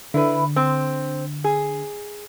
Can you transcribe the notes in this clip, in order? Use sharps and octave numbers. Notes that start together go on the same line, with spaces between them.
D3 E4 B4
C4
G#4